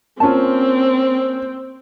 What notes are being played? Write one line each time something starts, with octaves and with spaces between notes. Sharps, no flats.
A#3 C4 C#4 F4 A5